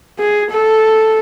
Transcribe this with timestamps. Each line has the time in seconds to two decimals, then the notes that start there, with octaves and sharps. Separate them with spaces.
0.19 G#4
0.51 A4